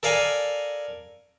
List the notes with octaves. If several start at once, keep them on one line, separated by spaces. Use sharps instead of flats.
A4 A#4 D5 F5 G#5